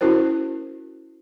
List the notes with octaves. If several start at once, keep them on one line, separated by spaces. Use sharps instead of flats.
C#4 E4 F#4 A#4 C5